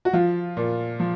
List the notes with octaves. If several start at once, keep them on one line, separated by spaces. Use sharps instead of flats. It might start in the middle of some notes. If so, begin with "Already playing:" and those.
F#4
F3 F4
A#2
F3